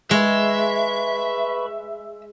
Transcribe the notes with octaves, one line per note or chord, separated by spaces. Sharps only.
G#3 B4 E5 B5 C#6